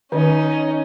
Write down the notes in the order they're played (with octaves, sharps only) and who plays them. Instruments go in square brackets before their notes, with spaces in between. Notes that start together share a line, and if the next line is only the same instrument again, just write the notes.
[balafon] D#3 [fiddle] C#4 D#4